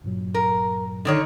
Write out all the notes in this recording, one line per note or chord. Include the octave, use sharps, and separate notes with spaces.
G2 A#2 F#3
A#4
D3 D#3 C#5